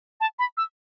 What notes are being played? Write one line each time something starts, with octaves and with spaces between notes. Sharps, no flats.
A5
B5
E6